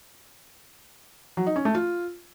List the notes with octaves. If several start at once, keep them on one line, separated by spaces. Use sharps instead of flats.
F#3
D#4
C#4
A3
F4